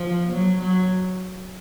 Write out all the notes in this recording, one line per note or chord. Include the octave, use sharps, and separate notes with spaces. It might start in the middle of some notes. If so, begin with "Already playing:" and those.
Already playing: F3
F#3
F#3